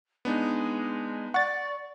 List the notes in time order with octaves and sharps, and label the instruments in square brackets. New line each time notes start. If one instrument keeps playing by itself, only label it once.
[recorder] G#3 [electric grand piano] B3 D4 D#4
[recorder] D5 [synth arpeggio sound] F#5 A6 [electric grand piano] C#6